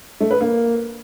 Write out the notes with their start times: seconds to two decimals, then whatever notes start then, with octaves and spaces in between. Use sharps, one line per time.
0.20 A3
0.31 B4
0.41 A#3